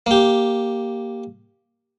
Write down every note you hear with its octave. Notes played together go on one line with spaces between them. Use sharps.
A#3 G4